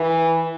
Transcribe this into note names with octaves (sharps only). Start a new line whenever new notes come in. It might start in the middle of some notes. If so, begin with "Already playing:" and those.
Already playing: E3